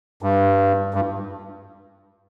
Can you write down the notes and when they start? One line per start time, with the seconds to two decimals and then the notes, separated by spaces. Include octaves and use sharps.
0.22 G2
0.94 G2